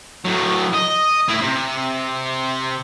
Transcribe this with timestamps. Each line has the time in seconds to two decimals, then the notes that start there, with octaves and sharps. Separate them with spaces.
0.24 A2 F#3
0.73 D#5
1.28 A2 E4
1.41 C3